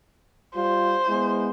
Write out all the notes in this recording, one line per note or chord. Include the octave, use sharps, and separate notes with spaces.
G3 F4 C5
G#3 B3 E4